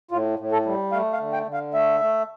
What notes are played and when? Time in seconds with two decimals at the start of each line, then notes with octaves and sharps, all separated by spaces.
0.11 A2 F4
0.39 A2
0.52 A4
0.66 G3
0.92 A3 F5
1.13 F5
1.19 D3
1.33 G5
1.47 D3
1.53 F5
1.74 A3 E5
2.01 A3